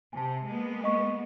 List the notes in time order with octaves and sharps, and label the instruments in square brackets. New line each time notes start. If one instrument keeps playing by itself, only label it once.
[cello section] C3 [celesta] G#5 A5
[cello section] G#3 A#3 B3
[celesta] D#5 C#6